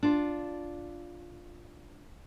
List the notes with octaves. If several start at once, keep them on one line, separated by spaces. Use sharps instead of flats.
D4 F4